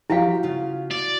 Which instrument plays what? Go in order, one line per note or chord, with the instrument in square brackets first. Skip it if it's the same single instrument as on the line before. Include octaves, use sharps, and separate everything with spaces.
[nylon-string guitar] F3 G4 G5 [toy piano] E4 F5 [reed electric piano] F#4
[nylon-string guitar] C#3 F4
[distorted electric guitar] D5